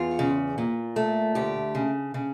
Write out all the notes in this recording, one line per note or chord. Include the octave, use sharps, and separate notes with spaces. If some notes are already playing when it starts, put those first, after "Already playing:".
Already playing: E2 F4
C#3
A#2
A3
D2 G4
C#3
C#3